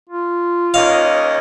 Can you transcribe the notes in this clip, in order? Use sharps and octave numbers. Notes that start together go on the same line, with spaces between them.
F4
D#2 C#4 D#5 F5